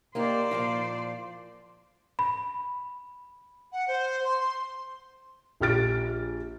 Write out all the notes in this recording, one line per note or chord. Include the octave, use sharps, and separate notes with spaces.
A#3 D#4 G4 C5 D5
A#2 F3 F4
B5
F#5
C5
C6
C6
A#1 G4 F6 A6 D7